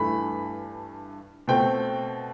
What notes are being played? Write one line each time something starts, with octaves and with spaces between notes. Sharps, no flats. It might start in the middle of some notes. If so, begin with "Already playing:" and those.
Already playing: G2 E3 A3 B5
B2 A3 C4 G5